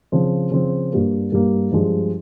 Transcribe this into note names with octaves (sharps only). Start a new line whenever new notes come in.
C#3 F3 C4
C#3 F3 C4
G2 G3 A#3
G2 G3 A#3
G2 F3 G#3